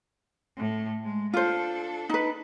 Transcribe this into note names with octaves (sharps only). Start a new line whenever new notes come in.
A2 A3
G#3
D4 F4 A4 C5
D#4 B4